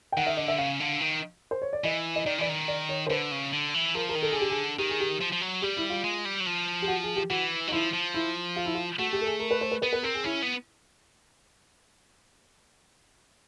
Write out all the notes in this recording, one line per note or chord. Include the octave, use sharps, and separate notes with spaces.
G5
D#3 F#5
E5
D3 D#5
E5
C#3 F5
D3
D#3
C5
C#5
D5
E3 D#5
D#5
D#3 D5
E3 D5
D#3
D5
C#5
C5
D3 B4
C#3
D3
E3
F3 A#4
A#4
D#3
A4
G#4
D3
G4
G#4
D#3 G4
G#4
G4
F3
F3
F#3
G3 G4
E4
F4
G#3
G3
F#3
F3
G4
F#4
G#4
G4
E3 F#4
F#3 D#4
F3 E4
F3
E4
F4
E4
F4
A3 F#4
G4
A4
G#4
A#4
B4
C5
B4
B3 B4
B4
C4 A#4
G#4
C#4 E4
B3